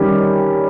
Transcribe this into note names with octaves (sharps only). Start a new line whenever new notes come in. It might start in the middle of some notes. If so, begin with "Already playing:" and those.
Already playing: D#3 G3 C#4